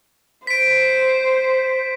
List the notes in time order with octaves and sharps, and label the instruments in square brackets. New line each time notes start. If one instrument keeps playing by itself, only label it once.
[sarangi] C5 [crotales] B6 D7